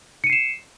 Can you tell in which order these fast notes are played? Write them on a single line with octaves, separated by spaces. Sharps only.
C#7 D#7 C7 E7